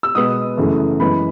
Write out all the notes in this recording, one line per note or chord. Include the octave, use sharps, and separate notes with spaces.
E6
B2 G#3 B3 D#6
F#2 C#3 E3 A3
F#2 E3 G#3 B3 B5